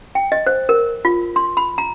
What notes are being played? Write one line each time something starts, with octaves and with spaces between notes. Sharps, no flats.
G5
D#5
C5
A#4
F4
C6
B5
A#5